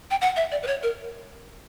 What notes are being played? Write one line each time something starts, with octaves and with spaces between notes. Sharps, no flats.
G5
F#5
E5
D5
B4
C#5
A#4